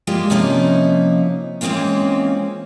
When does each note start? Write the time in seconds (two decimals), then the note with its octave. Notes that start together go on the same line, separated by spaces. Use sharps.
0.07 G3 G#3 A#3 F4 G4
0.30 C3 F3 A#3 C#4 D#4 E4
1.61 E3 G#3 A#3 C4 C#4 F4